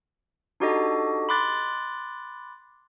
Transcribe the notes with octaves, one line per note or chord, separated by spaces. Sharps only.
D4 D#4 F#4 G4 A4 D#5
B5 C6 D6 F#6 A6